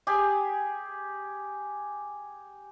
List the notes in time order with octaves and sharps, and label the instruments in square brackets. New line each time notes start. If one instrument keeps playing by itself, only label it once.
[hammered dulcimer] G4 G#4 G#5